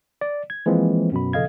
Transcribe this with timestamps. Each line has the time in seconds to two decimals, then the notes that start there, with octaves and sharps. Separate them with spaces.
0.21 D5
0.50 G#6
0.66 E3 F3 G#3 A#3 C4
1.12 F#2 B2 B5
1.33 A#1 C#3 A4 D#5 F5 G#6